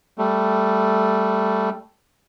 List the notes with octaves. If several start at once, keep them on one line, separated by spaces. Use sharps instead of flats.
G3 A3